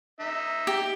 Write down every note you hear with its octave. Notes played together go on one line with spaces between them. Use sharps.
D#4 E5
G4